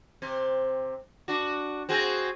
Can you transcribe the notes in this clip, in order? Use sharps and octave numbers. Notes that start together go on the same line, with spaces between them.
C3 C4
D4 F#4
C4 F#4 G#4